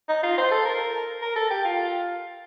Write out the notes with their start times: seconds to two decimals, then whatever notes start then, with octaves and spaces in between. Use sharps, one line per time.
0.09 D#4
0.23 F4
0.38 C5
0.51 A4
0.65 A#4
1.22 A#4
1.36 A4
1.50 G4
1.65 F4